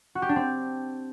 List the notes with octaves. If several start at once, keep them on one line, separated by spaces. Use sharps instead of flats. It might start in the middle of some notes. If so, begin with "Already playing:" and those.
F#4
G4
D4
C4